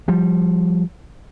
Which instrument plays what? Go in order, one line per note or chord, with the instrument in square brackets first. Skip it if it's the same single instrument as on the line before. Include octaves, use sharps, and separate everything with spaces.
[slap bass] F3 G3